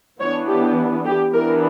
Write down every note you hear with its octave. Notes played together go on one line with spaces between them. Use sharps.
E3 B3 D4 C#5
G4
G4
E3 B3 D4 A#4